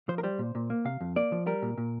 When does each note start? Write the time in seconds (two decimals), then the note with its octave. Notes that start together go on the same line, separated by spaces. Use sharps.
0.09 F3 C5
0.18 A#4
0.23 G3 C5
0.39 A#2
0.55 A#2
0.70 A#3
0.85 C3 F5
1.01 F2
1.16 A#3 D5
1.32 F3
1.47 G3 A#4
1.62 A#2
1.78 A#2